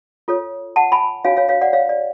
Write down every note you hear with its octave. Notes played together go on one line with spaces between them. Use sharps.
F4 A4 C#5
F#5 A5
G#5 B5
D4 F#4 C#5 F5 G#5
C#5 F5
C#5 F5
D5 F#5
C#5 F5
D5